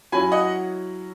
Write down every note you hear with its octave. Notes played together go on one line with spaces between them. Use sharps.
F#3 C#4 E4 G#5 B5
D#5 F#5